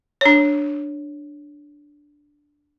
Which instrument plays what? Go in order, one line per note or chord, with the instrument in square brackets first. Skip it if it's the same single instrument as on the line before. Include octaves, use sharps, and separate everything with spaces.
[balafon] D4 C#5